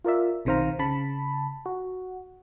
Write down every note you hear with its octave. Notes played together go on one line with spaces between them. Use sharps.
F4 A#4 D5 E5
B1 C3 D#3 C5 F5 A#5
C#3 A5 B5
F#4